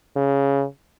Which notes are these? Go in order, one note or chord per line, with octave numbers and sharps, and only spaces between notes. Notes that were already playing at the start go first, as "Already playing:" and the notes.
C#3